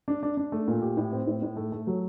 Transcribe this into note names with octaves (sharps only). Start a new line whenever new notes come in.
D4
D4
D4
A3
A#2
G4
A2
C4
A2
A2
A3
A3
F#3